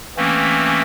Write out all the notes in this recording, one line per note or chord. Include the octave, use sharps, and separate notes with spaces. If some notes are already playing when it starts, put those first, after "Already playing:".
E3 A3 A#3 C4 C#4